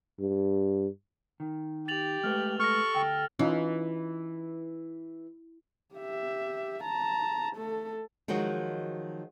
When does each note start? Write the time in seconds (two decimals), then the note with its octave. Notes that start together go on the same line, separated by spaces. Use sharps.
0.19 G2
1.40 D#3
1.88 G4 A6 F7 F#7
2.24 G#3 A3 B4 F6
2.60 A4 C#6 F6 A#6
2.95 D2 G5
3.39 E3 C#4 D#4 F4
5.95 G4 E5
6.83 A5 A#5
7.56 A3 A4
8.28 D#3 F3 F#3 G#3 F#4